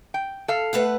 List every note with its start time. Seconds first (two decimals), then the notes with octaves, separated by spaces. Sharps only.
0.14 G5
0.48 A4 F5
0.73 A3 B4 F#5